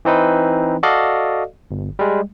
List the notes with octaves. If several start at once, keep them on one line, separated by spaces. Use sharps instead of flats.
E3 C4 D#4 B4
F#4 A4 D5 D#5 F5
G1
G3 G#3